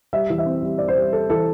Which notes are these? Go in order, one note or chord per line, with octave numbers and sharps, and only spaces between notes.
G3 E5
E3
E5
C4
G3
C4 D5
C5
G3
G3 A4
E3 A4